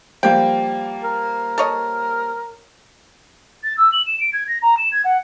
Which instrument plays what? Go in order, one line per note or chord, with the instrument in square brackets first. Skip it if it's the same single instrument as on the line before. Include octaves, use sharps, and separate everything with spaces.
[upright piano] F3 G3 A#3 [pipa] G5
[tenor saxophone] A#4
[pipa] A4 C#5 D#5
[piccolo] A6
E6
F#7
E7
D7
G#6
A#6
A#5
E7
G#6
F#5